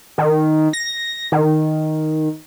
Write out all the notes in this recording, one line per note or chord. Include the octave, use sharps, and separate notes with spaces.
D#3
A#6
D#3